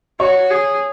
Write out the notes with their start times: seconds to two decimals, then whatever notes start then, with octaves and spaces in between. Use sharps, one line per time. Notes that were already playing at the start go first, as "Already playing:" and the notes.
0.20 F#4 C#5
0.50 G#4